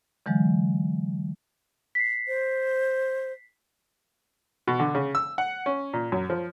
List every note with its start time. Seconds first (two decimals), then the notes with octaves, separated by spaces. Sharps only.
0.26 D3 E3 F#3 G#3
1.95 B6 C7
2.28 C5
4.67 B2
4.80 D3
4.95 C#3
5.15 E6
5.38 F#5
5.66 C#4
5.93 A#2
6.12 F#2
6.30 F3